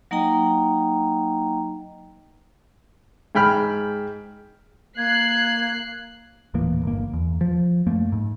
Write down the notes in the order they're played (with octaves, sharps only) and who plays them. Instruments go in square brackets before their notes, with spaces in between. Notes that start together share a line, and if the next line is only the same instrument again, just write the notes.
[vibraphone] F#3 A#3 D#4 D#5 G5 A#5
[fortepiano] G#2 G5 B5 F6
[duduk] A#3 [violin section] F#6 C7 [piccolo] G#6
[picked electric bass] D#1 A2 E3 A#3
G1 A#3
E2
F3
F#2 A3 A#3
G#2